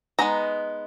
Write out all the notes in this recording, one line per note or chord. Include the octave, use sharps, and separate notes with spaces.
G#3 B3 D#4 A#5